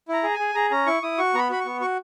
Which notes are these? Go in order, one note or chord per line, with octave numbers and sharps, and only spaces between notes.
E4 A#5
G#4
G#5
G#4
G#4 A#5
C#4 A#5
E4 C#6
E4 D#6
F#4 C#6
B3 A#5 B5
F#4 B5
C#6
B3
F#4 C#6